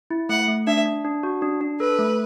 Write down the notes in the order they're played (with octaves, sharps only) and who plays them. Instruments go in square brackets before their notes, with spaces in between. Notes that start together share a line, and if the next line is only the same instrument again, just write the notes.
[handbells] E4
[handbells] A3 [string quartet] F#5
[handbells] A3
[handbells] D4 [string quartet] E5
[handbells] D4
D4
F#4
D4
D4
[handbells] A4 [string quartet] B4
[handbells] A3